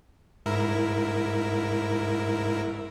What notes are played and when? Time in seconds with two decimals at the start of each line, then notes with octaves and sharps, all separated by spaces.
0.46 G#2 E4 A#4